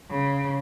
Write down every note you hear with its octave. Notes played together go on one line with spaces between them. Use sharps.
C#3